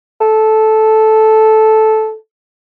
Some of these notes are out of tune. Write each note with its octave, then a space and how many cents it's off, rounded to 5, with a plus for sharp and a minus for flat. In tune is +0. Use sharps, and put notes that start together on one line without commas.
A4 -10